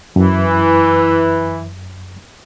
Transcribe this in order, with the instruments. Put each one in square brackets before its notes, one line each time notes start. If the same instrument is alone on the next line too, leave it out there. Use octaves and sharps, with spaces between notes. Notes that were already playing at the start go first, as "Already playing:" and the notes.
[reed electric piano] F#2 [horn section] E3